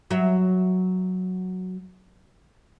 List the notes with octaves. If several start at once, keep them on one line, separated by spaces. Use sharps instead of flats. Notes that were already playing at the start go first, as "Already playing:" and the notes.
F#3 E5